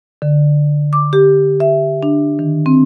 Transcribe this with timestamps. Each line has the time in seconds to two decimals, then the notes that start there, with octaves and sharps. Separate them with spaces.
0.22 D3
0.93 D6
1.13 G4
1.60 E5
2.03 D4
2.39 D#3
2.66 C4